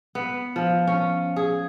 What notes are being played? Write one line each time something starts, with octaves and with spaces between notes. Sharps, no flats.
B3
F3
C#4
G#4